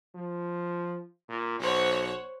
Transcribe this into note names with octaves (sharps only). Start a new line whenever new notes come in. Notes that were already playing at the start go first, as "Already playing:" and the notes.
F3
A#2
B1 C5 C#5 F#5